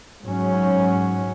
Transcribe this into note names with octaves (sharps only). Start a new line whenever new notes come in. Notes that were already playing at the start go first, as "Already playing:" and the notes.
G#2 F#3 C#4